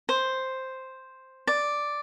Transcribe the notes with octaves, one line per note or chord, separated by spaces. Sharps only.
C5
D5